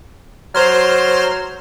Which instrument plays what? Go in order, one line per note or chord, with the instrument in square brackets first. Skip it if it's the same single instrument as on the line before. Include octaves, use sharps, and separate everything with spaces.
[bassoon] F#3 [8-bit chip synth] C5 C6 F6